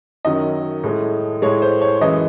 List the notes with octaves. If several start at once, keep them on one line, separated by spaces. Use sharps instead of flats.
F#2 D#3 F#3 D#5
A2 G#3
A2 G#3 C#5
C5
C#5
F#2 E3 G#3 D#5